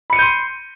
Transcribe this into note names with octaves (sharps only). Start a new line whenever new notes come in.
B5 C6 G6 C#7 D#7